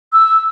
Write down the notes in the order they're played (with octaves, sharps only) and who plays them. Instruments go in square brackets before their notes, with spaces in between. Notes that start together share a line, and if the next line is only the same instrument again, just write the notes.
[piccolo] E6